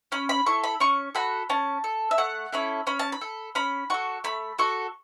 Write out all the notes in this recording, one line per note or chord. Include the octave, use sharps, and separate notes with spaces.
C#4 B5
B5
E4 A4 C#6
B5
C#4 C#6
F#4 A4 B5
C#4 A5
A4
E5
A3 F#5
C#4 E4 A4 B5
C#4 B5
A5
B5
A4
C#4 B5
F#4 A4 C#6
A3 B5
F#4 A4 C#6